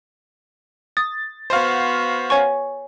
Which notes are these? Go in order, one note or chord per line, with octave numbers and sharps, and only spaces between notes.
D#6 A6
B3 F#4 C5 F5
C#5 G#5 C#6